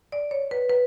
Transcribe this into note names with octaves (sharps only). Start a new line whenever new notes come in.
D5
C#5
B4
B4